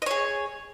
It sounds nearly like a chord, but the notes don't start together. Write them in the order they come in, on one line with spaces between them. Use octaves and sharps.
D#5 C#5 G#4